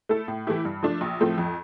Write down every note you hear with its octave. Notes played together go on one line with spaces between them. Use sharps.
A3 E4 A4
A2
E3 A3 E4 G4
G2
F3 A3 D4
A#1
A2 F3 A3 C4
F2